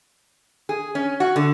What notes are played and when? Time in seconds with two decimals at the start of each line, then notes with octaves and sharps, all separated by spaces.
0.69 G#4
0.95 C#4
1.20 F#4
1.36 D3